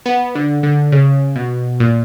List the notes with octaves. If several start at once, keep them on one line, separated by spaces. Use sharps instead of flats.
B3
D3
D3
C#3
B2
A#2